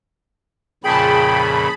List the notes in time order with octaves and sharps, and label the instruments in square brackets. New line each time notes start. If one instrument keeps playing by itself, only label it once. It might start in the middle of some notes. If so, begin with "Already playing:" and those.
[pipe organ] F2 A#2 C#3 [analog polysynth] G#4 A5 [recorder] G5 [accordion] B5